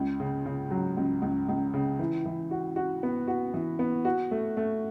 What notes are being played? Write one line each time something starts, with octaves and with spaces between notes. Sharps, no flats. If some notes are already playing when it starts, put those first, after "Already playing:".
Already playing: C#2
C#3
C#3
F#3
C#2
C#2
C#2
C#3
E3
E3
F#4
F#4
B3
F#4
E3
B3
F#4
A3
A3